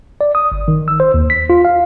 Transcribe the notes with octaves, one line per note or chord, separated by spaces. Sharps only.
D5
D#6
G1
D#3
E6
C5
D#2
B6
F4
F5